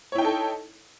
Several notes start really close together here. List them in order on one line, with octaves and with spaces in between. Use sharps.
C#5 E4 G5 D#4 A4